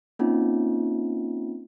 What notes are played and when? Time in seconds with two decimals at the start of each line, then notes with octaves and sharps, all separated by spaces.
0.19 A#3 C4 C#4 D#4 F4